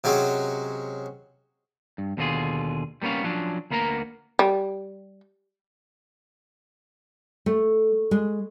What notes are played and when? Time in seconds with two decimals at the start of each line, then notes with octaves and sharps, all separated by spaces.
0.04 C3 F#3 G#3 C#4
1.98 G2
2.17 D#2 B2 D3 C#4 F4 G#4
3.02 G3 A#3 B3 C#4 F5
3.24 F3 F#3 C#4 D4
3.71 D2 A#3 B3 A#4 A#5
4.39 G3
7.46 A3
8.11 G#3